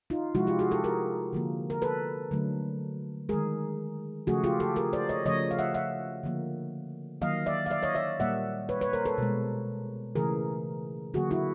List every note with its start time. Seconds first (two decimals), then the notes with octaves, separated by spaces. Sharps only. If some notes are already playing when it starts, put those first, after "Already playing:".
0.10 D#4 F4
0.34 C3 F3 G#3 E4 F#4
0.47 F4 G4
0.59 F#4 G#4
0.71 G4 A4
0.84 G#4 A#4
1.33 D3 F3 A#3
1.70 A#4
1.82 A4 B4
2.31 D3 F#3 A3
3.29 D#3 G#3 G#4 A#4
4.27 C#3 F3 A3 F#4 G#4
4.44 F4 G4
4.60 G4 A4
4.76 G#4 A#4
4.93 C5 D5
5.09 C#5 D#5
5.25 C#3 F3 A3 C#5 D#5
5.51 F5
5.58 E5 F#5
5.74 E5 F#5
6.24 D3 F3 A#3
7.21 D#3 F#3 A#3 D#5 F5
7.46 D5 E5
7.66 F5
7.70 D5 E5
7.83 C#5 D#5
7.95 D5 E5
8.19 A#2 G3 A#3 E5 F#5
8.69 B4 C#5
8.81 B4 C#5
8.93 A#4 C5
9.06 A4 B4
9.18 B2 G#3
10.15 C#3 E3 A3 G#4 A#4
11.14 D3 F#3 A#3 F#4 G#4
11.31 E4 F#4